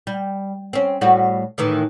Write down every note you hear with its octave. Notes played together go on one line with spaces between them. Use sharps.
G3
C4 C#4
A2 G3 F#4
A2 D#3 E3